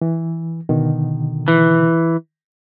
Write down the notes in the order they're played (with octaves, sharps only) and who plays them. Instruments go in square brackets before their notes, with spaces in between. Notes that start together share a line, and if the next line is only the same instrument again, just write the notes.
[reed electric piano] E3
B2 D3 D#3
[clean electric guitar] E3